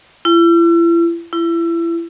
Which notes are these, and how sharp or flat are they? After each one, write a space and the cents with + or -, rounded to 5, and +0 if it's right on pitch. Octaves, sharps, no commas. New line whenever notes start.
E4 +40
E4 +30